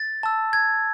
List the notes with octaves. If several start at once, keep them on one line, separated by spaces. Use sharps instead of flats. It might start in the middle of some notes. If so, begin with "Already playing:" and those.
Already playing: A6
A5 E6
G#6